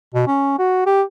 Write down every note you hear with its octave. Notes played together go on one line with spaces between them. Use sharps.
B2
C#4
F#4
G4